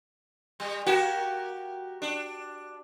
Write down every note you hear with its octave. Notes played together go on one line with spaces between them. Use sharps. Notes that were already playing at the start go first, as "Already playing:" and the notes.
G3
A#3 F#4 G4
D4